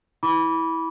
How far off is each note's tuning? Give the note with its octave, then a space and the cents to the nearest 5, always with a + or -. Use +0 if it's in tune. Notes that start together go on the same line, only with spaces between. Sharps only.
E4 -15 B5 -15 D6 -30